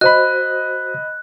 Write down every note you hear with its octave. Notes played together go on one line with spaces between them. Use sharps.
F#4 C5 D#5 B5 F#6